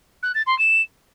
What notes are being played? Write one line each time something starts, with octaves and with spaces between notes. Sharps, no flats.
F#6
A6
C6
E7